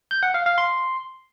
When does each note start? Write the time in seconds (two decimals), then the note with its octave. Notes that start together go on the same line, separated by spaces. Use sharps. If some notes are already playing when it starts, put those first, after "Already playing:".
0.11 G6
0.23 F#5
0.34 F5
0.46 F5
0.58 C6